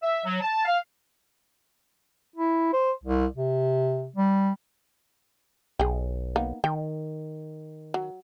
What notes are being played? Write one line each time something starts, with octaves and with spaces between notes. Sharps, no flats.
E5
F#3
A5
F5
E4
C5
C2
C3
G3
B1 G#4 G5
A#3 B3 D#4
D#3 G5
F#3